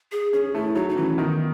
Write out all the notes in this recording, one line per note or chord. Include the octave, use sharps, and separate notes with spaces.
G#4
C#4 G#4
A3 E4
F#3 D#4
D#4
E3 C#4
D#3 B3